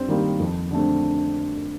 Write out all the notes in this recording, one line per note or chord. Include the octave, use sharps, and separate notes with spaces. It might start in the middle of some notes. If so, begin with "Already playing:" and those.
Already playing: G2 C4 C5
D#3 G3 A#3
F2
D3 A3 C4